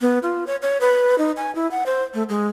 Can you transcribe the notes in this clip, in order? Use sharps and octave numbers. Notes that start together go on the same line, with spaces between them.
B3
F4
C#5
C#5
B4
D#4
G#5
E4
F#5
C5
A3
G#3